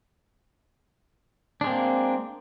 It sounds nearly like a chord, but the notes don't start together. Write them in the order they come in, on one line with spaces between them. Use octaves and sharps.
D4 G#3 C4 A#3